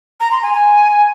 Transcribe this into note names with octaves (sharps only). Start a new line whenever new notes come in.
A#5
C6
G#5
G#5